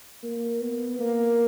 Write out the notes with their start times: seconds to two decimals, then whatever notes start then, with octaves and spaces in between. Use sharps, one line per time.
0.23 A#3
0.61 B3
0.99 A#3